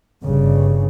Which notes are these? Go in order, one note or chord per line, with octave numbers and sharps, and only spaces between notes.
G1 G2 C#3